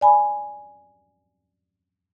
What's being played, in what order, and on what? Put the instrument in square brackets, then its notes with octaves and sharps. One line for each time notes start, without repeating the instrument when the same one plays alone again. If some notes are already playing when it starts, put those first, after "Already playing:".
[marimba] D5 G#5 B5